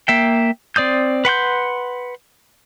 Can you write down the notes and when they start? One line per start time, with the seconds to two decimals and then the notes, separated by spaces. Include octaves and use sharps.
0.08 A#3 E5 G5
0.76 C4 D5 D#6 G6
1.25 B4 F#5 C6 G6